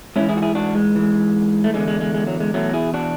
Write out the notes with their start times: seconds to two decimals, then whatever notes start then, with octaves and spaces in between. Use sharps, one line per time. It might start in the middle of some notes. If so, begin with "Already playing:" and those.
0.16 G#2 C#4 E4
0.20 E3
0.29 E4 G#4
0.37 F#4
0.42 E4 G#4
0.55 D4 F#4
0.75 G#3
0.95 G#2 E3
1.64 A3
1.74 E2 D3 G#3
1.88 G#3
2.00 G#3
2.14 G#3
2.27 F#3
2.40 G#3
2.54 E2 B2 F#3 A3
2.74 E4 G#4
2.94 D4 F#4